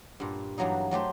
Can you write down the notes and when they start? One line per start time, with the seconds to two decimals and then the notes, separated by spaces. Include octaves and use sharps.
0.20 G2 A#2
0.58 G2 E3 F#3 A#3 D#4
0.91 F#3 A3 G4 C5